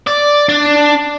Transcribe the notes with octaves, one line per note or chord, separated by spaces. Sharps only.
D5
D4